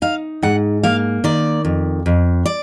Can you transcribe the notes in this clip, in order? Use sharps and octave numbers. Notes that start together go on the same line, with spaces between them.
D#4 F5
G#2 F#5
A#3 F5
D#3 D5
F2
F2
D5